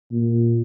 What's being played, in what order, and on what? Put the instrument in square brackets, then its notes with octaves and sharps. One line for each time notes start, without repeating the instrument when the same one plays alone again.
[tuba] A#2